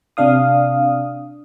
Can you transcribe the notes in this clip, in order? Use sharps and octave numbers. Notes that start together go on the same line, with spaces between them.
C3 D4 F5 D#6